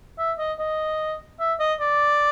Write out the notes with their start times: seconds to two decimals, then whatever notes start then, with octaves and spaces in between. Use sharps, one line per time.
0.18 E5
0.39 D#5
0.59 D#5
1.40 E5
1.60 D#5
1.80 D5